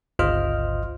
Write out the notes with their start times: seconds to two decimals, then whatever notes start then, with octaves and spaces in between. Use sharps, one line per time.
0.19 G1 C#2 F4 C5 D#5 F6